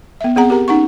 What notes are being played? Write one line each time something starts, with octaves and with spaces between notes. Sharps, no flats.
B3 E5
B3 C4 G#4 F#5 A#5
G4 A#4 A#5
C#4 D#4 F#5 C#6